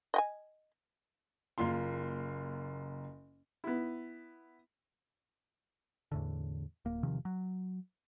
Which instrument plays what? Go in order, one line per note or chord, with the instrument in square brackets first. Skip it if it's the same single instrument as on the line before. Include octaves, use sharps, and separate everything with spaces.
[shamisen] D#5 G5 G#5
[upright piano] F#1 A#3 F4 C6
[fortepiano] B3 E4
[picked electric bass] E2 A2 D3
D1 A#3
E1 C3 D#3 F3
F#3